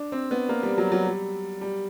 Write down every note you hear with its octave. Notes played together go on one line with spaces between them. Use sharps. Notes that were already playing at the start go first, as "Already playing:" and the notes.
Already playing: D4
C4
B3
A#3
G3
F#3
F#3
G3
G3